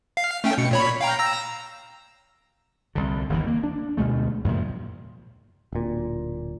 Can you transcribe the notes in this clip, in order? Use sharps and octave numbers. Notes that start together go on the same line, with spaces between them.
F5 C7
A3 C#4 G5
B2 C#7
A#2 C#5 B5
F5 G5 A#5
A#5 E6 A#6
C2 D3
G1 D#2 D#3 E3
A#3
D4
D2 B2 G#3 A3
F#2 A#2 C#3 F3
D1 A#2